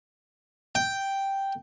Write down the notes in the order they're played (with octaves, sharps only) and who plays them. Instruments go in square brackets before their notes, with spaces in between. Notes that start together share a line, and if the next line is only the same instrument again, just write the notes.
[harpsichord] G5